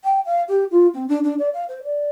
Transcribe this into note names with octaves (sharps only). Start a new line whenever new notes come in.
G5
F5
G4
F4
C4
D4
D4
D5
F5
C5
D5